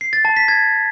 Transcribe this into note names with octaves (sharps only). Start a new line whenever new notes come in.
C7
A6
A5
B6
G#6